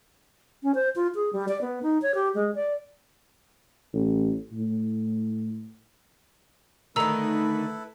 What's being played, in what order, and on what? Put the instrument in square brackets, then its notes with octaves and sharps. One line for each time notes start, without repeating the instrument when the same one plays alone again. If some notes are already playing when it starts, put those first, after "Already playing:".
[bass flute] C#4
C5
F4
G#4
G3
D5
B3
D#4
C#5
G4
G#3
D5
[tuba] A1
A2
[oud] D3 D#3 [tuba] A3 [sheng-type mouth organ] E4 A4 B4 [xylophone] A#5 E6